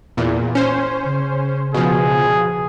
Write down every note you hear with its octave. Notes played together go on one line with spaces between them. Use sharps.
E2 A#2
C#4 C5
C#3
B2 F3 G#4